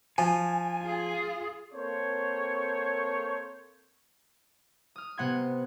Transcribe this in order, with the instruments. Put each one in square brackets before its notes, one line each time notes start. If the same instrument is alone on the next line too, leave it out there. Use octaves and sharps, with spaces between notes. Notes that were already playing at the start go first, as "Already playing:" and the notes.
[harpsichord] F3 [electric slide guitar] G#5
[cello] F4 G#4
[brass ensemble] A#3 C4 A4 C5 C#5
[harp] D#6 F6
C3 B3 F#5 C6 G#6